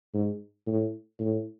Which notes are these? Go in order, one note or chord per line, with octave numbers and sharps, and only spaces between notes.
G#2
A2
A2